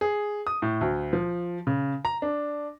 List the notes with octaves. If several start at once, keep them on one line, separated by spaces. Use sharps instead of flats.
G#4
D#6
A2
D2
F3
C#3
A#5
D4